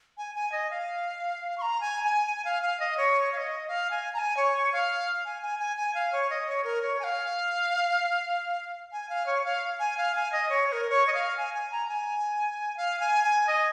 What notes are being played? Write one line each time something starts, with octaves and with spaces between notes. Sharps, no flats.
G#5
G#5
D#5
F5
C#6
A#5
G#5
G#5
G#5
F5
F5
D#5
C#5
F5
D#5
F5
G#5
A#5
G#5
C#5
F5
G#5
G#5
G#5
G#5
F5
C#5
D#5
C#5
A#4
C#5
G#5
F5
G#5
F5
C#5
F5
G#5
F5
G#5
D#5
C#5
C#5
A#4
C#5
D#5
F5
G#5
G#5
A#5
G#5
F5
G#5
G#5
D#5